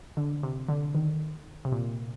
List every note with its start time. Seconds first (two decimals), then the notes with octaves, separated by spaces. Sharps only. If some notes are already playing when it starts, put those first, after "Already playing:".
0.17 D3
0.43 C3
0.69 D3
0.95 D#3
1.65 C3
1.72 A#2